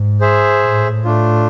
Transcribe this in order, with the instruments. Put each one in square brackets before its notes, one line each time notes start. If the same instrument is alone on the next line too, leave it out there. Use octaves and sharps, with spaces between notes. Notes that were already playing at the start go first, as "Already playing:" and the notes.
Already playing: [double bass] G#2
[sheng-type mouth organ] G#4 C5 E5
[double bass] A2
[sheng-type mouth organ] A3 D4 F4